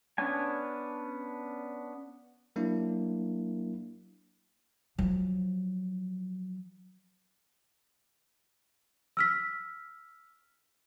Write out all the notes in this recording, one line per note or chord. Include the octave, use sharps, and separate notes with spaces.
B3 C#4 D4 G#5
F#3 A#3 D4 E4
F3 F#3
E6 F6 B6